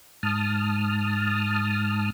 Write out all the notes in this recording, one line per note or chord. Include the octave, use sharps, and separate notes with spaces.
G#2 A5 D#6 F6